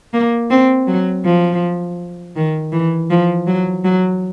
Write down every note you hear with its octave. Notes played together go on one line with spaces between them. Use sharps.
A#3
C4
F#3
F3
D#3
E3
F3
F#3
F#3